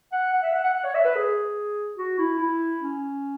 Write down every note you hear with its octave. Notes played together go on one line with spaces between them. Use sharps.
F#5
F#5
E5
F#5
F#5
F#5
C#5
E5
B4
G#4
F#4
E4
E4
C#4